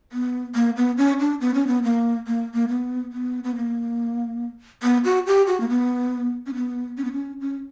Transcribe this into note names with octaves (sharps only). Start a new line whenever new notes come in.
B3
A#3
B3
C#4
D4
B3
C#4
B3
A#3
A#3
A#3
B3
B3
B3
A#3
B3
F#4
G4
F#4
A#3
B3
C#4
B3
C#4
B3
C#4
C#4